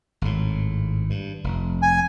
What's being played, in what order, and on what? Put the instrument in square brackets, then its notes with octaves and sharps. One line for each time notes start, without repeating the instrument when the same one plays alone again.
[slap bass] G#1 A2
G2
F1
[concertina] G#5